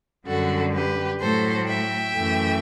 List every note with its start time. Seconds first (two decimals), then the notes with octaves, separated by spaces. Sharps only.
0.27 F#2 D3 G3 F#4 A4
0.74 G4 B4
1.20 A2 F#3 A3 A4 C5
1.67 E5 G5
2.13 F#2 E3 A3